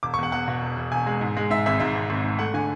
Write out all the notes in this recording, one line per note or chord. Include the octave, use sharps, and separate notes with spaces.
E1 D6
C#6
E2 F#5
E2 F#5
B2
E1
E1
E1 G#5
G#3
G#2
G#3
G#2 E5
G#1 E5
G#2 E5
G#2
G#1
G#2
A3 F#5
D3 G#5